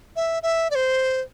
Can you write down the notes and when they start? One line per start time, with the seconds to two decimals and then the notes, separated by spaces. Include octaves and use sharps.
0.16 E5
0.43 E5
0.70 D5
0.75 C5